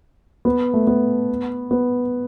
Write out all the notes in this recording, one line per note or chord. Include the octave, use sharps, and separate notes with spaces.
B3
A3
B3
B3